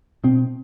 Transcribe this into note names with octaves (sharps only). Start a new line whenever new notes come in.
B2 C4